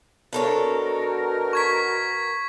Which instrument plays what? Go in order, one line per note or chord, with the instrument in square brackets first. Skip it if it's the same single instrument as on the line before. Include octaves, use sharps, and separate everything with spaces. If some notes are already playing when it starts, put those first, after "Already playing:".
[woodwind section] B2 A#4 [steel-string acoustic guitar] D4 A4 C#5
[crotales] C#6 G#6 B6